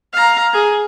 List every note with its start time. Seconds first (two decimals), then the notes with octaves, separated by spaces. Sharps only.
0.13 F5 A#5
0.53 G#4